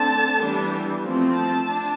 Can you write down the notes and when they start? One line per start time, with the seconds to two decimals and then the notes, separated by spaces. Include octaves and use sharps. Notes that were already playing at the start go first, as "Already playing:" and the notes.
Already playing: D3 A3 C4 A5
0.40 E3 G3 B3 D4
1.02 F3 A3 C4
1.34 A5
1.65 D4